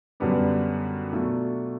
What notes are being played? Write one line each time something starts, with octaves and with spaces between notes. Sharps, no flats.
F#2 D3 G3 B3 D4
B2 F#3 A3 D4 F4